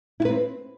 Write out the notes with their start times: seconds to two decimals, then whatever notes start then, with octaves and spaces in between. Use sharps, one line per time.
0.20 E4
0.25 B4
0.30 C4